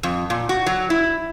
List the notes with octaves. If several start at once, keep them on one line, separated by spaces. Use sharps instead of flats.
F2
A#2
F#4
F#3
E4